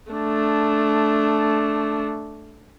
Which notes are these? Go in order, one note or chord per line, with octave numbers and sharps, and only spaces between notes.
A3 D4